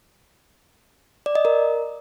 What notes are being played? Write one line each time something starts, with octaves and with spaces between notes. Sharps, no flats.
D5
D#5
A#4